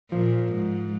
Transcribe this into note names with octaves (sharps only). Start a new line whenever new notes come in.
A#2 F3
G#2